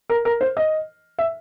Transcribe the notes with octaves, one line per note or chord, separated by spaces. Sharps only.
A#4
A#4
C5
D#5
E5